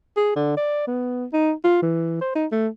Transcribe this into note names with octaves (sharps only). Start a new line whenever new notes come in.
G#4
D3
D5
B3
D#4
F4
E3
C5
D#4
A3